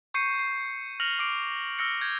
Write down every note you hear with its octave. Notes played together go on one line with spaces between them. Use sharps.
C#6 G6 C7 C#7 D#7
C7
F6 A#6 C#7 F7 F#7
D6 C7 D7
E6 F6 A#6 C#7
G6 G#6